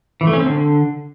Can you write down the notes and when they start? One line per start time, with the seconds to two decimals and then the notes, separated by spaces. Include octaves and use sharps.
0.21 E3
0.27 A3
0.33 C#4
0.39 C4
0.46 D3